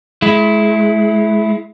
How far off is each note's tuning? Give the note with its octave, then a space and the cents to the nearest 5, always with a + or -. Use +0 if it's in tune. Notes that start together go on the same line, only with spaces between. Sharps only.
G#3 +35 E4 +0